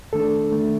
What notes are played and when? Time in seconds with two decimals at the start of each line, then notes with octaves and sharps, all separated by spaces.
0.13 F2 D#3 A3 D4 A4
0.51 D#3 A3 D4